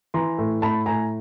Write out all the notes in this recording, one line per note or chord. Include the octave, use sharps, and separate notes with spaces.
E3 A#5 C6
A2
A2 A5 B5
A2 G#5 A#5